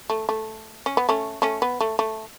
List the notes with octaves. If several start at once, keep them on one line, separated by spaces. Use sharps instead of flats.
A3
A3
C#4
B3
A3 C#4
A3 C#4
B3
A3
A3